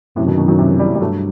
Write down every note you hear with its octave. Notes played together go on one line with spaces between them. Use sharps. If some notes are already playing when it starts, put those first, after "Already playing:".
F#2 A2 C3
B2 D#3
B2 D#3
D#3 F#3
C3 E3
E3 G3
G3
G2 F#3 A3